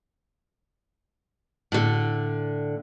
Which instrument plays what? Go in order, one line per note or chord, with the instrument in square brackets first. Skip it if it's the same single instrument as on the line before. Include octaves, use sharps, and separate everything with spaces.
[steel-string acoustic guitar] A2 D3